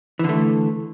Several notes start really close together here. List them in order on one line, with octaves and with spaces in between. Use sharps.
E3 D3 A3